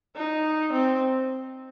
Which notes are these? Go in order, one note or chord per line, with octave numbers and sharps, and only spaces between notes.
D#4
C4